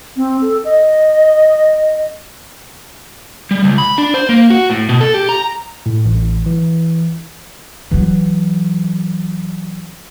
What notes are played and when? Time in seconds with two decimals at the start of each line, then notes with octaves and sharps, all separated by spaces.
0.16 C4
0.41 A4
0.64 D#5
3.51 G3
3.64 C#2
3.78 B5
3.98 D4
4.14 C5
4.29 A#3
4.50 F#4
4.70 A2
4.89 B2
5.01 A4
5.14 G4
5.29 A#5
5.86 A2
6.06 A1
6.46 E3
7.91 E3 F#3